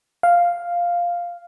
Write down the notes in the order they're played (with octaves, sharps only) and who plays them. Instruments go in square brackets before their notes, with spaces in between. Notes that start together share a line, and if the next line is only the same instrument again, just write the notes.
[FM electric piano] F5